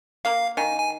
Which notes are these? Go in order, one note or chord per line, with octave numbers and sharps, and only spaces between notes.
A#3 F5
D#3 G#5
G#5